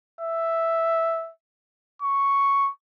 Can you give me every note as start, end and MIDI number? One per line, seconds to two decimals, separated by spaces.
0.21 1.31 76
2.02 2.71 85